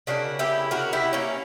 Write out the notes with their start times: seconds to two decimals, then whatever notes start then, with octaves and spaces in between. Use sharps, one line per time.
0.07 C#3 F#3 A#3 D4 F#4
0.39 E4 G4
0.71 F#4 A#4
0.93 E4 G4
1.13 A#3 C#4